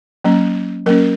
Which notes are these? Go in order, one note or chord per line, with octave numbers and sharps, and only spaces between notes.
F#3 A#3 C#4
F#3 A#3 C#4 A#4